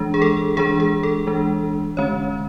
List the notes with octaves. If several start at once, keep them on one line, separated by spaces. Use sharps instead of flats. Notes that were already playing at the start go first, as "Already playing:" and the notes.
Already playing: E3 G#3 D4
G#4
A4
E3 G#3 D4 G#4
G#4
A4
E3 G#3 D4
D3 G#3 C#4 C#5